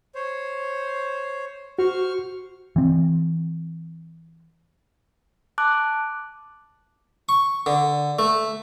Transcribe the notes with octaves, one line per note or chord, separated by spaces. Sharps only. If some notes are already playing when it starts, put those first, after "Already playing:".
C5 C#5
F#4 C5 C#6 F6
E3 C4
A5 D6 F#6
C#6
D3
A3